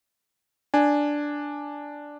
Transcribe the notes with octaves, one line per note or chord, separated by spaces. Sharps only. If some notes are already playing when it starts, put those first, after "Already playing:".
D4 G#5